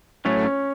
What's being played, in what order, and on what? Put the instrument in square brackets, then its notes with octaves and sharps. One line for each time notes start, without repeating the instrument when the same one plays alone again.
[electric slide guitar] A2 F#3 A3 [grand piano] C#4
[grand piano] C#4